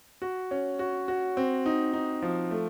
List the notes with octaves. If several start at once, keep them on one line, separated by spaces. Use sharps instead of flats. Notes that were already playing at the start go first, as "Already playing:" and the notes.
F#4
C#4
F#4
F#4
C4
D#4
D#4
F3
A3